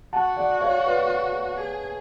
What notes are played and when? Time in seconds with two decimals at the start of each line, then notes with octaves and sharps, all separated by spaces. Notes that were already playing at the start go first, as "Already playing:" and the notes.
0.13 F#4 F#5 A5
0.36 D5 F#5
0.60 C#5 F5
0.85 B4 D5
1.57 G#4